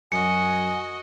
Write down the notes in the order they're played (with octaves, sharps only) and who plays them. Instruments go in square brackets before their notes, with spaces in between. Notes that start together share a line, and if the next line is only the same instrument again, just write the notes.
[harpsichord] F#2 [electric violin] F#4 D#5 [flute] G#5 [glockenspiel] C#7